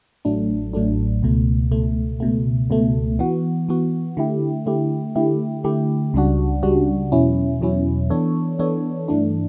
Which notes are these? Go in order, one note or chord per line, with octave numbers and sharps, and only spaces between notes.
A1 A2 F#3 A3 D4
A1 A2 F#3 A3 D4
C#2 B2 A3
C#2 B2 A3
C#2 B2 A3
C#2 B2 A3
E3 B3 F#4
E3 B3 F#4
D3 A3 E4 G4
D3 A3 E4 G4
D3 A3 E4 G4
D3 A3 E4 G4
C#2 C#3 G3 D4 F#4
C#2 C#3 G3 D4 F#4
E2 B2 F#3 C#4 E4
E2 B2 F#3 C#4 E4
E3 B3 D4 A4 C#5
E3 B3 D4 A4 C#5
G2 E3 A3 D4